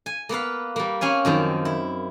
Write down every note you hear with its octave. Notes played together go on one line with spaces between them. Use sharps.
G#5
A#3 B3 B4 F5
G3 A#3
C4 C#4 F5 G#5
F#2 D#3 F3 C4
E4